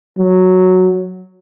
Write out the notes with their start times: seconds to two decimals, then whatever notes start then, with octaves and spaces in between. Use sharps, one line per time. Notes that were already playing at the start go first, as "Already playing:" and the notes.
0.17 F#3